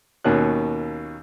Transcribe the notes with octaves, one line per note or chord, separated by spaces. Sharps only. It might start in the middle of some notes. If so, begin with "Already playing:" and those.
D#2 B2 A#3 C#4 A#4 F#6